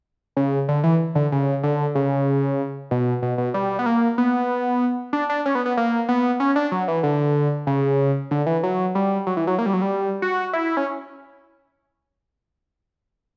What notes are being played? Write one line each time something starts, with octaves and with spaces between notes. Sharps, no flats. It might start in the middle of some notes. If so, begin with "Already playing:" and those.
C#3
D3
E3
D3
C#3
D3
C#3
B2
B2
B2
G3
B3
A#3
B3
D4
D4
C#4
B3
B3
A#3
B3
C#4
D4
F#3
E3
D3
C#3
D3
E3
F#3
G3
F#3
E3
F#3
A#3
G3
F#3
G3
F#4
E4
C#4